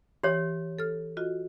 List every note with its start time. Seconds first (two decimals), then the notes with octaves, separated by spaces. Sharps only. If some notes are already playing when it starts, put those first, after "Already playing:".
0.23 E3 G4 C#5
0.79 A4 F6
1.17 F4 F#4 D#5